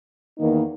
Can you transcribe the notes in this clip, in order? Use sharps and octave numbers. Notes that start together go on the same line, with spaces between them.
E2 D#3 A#3 D#4